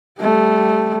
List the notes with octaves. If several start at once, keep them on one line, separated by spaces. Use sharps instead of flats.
G3 A3